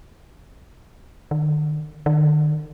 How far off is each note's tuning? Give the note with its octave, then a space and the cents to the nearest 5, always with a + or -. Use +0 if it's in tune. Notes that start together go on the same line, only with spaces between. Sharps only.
D#3 -45
D#3 -45